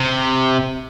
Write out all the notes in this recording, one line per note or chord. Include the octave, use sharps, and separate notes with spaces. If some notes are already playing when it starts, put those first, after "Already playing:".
Already playing: C3